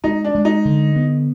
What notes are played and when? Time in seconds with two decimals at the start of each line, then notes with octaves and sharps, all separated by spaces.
0.04 G#3 D#4
0.24 D4
0.35 G#3
0.45 D#4
0.65 D3
0.96 B3